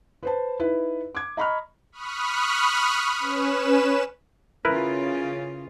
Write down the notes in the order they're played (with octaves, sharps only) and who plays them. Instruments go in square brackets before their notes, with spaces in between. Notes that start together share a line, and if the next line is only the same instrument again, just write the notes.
[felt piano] B4 C5 A5
D#4 E4 B4
D6 G#6
D#5 A#5 B5 C#6 F6
[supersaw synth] B5 C#6 D#6 F6 F#6
C#4 B4 E7
[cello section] C#3 F4 [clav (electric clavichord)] E4 A#4 B4